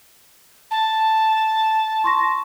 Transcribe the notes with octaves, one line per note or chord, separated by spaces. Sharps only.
A5
C6 C#6 A#6